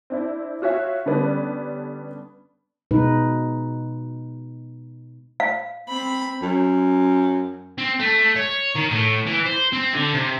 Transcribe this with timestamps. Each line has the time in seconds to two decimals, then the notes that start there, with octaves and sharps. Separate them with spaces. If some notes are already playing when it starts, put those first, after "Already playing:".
0.10 C4 D4 E4
0.62 F4 F#4 C#5 E5 F#5
1.06 D3 G3 B3 C#4 D4
2.91 B2 G#3 D#4 B4
5.40 F5
5.89 C4 B5
6.42 F#2
7.78 C4
8.00 A3
8.36 C#5
8.75 D#3
8.90 A2
9.26 E3
9.45 C5
9.73 C4
9.94 D3
10.14 C3